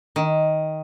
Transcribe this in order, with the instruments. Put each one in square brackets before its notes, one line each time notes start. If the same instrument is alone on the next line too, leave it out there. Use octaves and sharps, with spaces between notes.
[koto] D#3